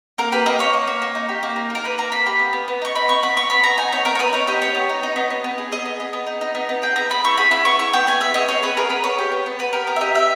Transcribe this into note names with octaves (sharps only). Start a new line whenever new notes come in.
A#3 A#4
G4 B4
A#3 D#5
A#3 C#5
A#3
A#3
A#3
D#4
G4
A#3
D#4
A#3 A#4
A#3 B4
A#3 A#5
A#3 B5
G4 B5
B3
B3
B3
D#4 C#6
D#4 B5
B3 C#6
B3 B5
B3 C#6
B3 B5
B3 A#5
D#4 G#5
B3 C#5
B3 A#4
C#5
B3 B4
D#4 C#5
G4 D#5
B3 C#5
B3
D#4
D#4
B3
B3
B3
G#4
G#4 D#5
B3
B3
B3
D#4
D#4
B3
B3
G#4 G5
B3 A#5
B3 B5
E4 C#6
G#4 B5
E4 B5
B3 C#6
E4 C#6
B3 G5
B3 G#5
G#4 E5
B3 D#5
G#4 C#5
B3 B4
G#4 A#4
B3 B4
B3 C#5
G4
B3
B3
B3 B4
G4 A#4
B3 A#4
E5
G4 D#5
G4 E5